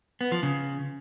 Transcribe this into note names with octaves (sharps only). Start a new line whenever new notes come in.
B3
F3
C#3